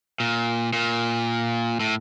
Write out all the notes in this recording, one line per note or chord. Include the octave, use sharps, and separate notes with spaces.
A#2
A#2
A2